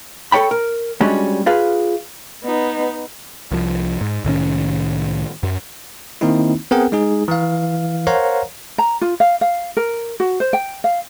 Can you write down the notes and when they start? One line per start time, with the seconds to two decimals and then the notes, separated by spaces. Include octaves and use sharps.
0.32 A4 A#4 C#5 G5 B5
0.51 A#4
1.01 G3 G#3 C#4 D4 F#4
1.46 F4 G#4 B4 F5
2.44 B3 D#4
3.51 C2 F3
4.01 G#2
4.24 C2 A2 D#3 C#4
5.43 F#2
6.21 D#3 A#3 C4 D#4 E4
6.71 B3 C4 G#4 A#4 F#5 G5
6.92 G#3 D#4 G#4
7.28 E3 F5
8.07 A#4 C5 C#5 F5 F#5 A#5
8.78 A#5
9.01 F4
9.20 F5
9.41 F5
9.77 A#4
10.20 F#4
10.40 C5
10.53 G5
10.84 F5